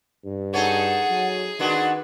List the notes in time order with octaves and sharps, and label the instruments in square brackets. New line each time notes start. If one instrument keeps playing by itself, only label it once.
[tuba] G2
[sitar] D#4 A4 C#5 [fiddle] G#4 [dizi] F#5
[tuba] F#3
[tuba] D#3 [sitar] G#3 D4 F#4 [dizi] B4